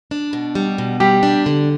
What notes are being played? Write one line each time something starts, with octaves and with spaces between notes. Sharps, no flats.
D4
B2
G3
B2
G3 G4
D4
D3